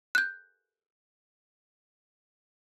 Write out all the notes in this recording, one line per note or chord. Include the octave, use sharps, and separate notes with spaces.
F#6 G6